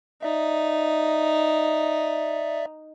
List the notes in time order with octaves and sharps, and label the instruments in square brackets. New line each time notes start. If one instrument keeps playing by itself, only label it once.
[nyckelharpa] D#4 [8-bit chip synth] D5 E5